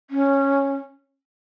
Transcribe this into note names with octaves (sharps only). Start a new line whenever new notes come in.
C#4